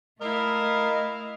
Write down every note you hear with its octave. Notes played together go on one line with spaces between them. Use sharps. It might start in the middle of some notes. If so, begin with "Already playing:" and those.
A3 E4 A#4 D#5 F5